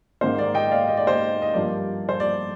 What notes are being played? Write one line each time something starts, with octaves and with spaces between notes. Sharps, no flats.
G#2 D#3 A#3 C5
D5
D#5 G5
D5 F5
D#5
D5
C5 D#5
D#5
G2 F3 A#3 D5
C5
D5